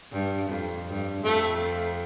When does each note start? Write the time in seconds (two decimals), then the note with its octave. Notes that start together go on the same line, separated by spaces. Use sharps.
0.12 G2
0.50 F2
0.88 G2
1.24 F2 A3